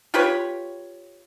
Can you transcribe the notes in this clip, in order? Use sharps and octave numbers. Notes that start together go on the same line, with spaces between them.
F4 G4 B4 C#5